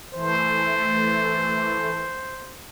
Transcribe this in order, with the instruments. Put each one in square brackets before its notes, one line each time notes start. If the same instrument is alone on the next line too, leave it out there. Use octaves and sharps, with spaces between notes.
[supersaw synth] E3 A3 [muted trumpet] C5